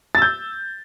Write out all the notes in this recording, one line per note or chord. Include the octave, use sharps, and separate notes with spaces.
E6 G6 A6